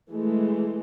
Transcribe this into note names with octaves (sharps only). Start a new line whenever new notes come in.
E3 G#3 A3